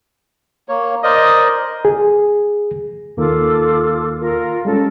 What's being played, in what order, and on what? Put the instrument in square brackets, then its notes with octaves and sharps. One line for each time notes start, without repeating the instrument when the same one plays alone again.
[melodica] A#3 C#5
[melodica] A#4 C5 D5 [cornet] D#5
[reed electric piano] G#4
[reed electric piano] D#2 D#3 A#3 [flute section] F4 D6 [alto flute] A4
[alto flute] F4 [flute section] A#4
[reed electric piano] G3 G#3 C#4 [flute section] A4